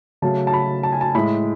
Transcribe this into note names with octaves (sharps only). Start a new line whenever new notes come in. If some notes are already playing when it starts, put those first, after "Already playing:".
C#3 F#3 A3 A5
A5
B5
A5
G#5
A5
A2 G#3 B5